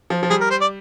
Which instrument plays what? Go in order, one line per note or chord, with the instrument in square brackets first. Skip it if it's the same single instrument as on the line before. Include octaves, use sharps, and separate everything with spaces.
[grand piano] F3
F3
[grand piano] G3 [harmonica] G#4
[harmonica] A#4
C5
D5